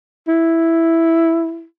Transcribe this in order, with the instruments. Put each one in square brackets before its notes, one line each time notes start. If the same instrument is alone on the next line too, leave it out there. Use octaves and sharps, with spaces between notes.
[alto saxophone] E4